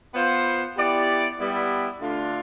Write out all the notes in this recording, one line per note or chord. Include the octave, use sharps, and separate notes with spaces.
B3 F4 C5
B3 E4 G4 D5
G3 B3 E4
D3 A3 D4 F4